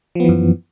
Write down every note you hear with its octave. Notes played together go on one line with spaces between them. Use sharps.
F#2 E3 F3 B3